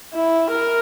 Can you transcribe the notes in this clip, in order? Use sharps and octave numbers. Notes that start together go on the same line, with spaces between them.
E4
A#4